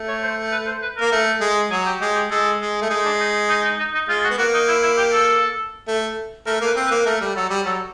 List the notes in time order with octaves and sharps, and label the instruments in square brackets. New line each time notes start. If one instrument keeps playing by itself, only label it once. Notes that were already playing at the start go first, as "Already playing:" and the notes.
Already playing: [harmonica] A3
[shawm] C#5
C5
B4
C5
B4
[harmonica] A#3 [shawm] A#4
[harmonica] A3
G#3
[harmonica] F#3 [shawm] G#4
[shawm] G4
[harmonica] G#3 [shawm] G4
[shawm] G4
[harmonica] G#3 [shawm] A4
[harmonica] G#3
A3
[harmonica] G#3 [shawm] D#4
[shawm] D4
D#4
D#4
D#4
D#4
D#4
[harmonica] G#3 [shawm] F4
[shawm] F#4
[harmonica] B3
[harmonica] A#3 [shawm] F#4
[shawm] D#4
E4
E4
G4
A4
[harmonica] A3
[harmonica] A3 [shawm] A#4
[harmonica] A#3 [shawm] B4
[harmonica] C4
[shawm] B4
[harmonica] A#3
[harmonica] A3 [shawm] A#4
[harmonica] G3
[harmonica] F#3 [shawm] A4
[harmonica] G3
[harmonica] F#3 [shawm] A4